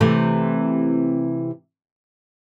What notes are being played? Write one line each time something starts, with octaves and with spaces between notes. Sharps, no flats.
C3 E3 A3